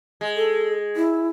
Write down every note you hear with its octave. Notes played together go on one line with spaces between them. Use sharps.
G#3
A4
E4